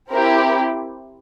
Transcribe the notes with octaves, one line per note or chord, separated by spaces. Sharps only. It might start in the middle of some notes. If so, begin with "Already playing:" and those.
C4 E4 G4 A#4